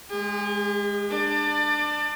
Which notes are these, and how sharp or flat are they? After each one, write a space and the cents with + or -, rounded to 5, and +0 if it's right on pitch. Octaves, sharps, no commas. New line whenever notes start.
G#3 +0 G#4 -45
D4 +20 D5 +30